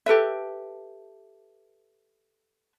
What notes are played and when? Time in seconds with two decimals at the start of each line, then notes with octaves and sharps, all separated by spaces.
0.06 G4 A4 B4 E5